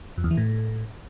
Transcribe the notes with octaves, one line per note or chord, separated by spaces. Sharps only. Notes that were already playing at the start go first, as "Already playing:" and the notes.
F2
E2
E3
A2